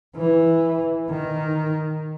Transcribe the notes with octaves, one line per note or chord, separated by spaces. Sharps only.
E3
D#3